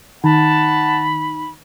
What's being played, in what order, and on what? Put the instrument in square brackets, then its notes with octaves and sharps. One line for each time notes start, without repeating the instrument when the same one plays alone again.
[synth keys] D#3 [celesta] D#4 [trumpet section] F#5 A5 [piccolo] B5